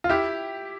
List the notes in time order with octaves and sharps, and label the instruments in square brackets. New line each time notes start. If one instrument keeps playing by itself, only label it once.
[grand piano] F4
E4 G4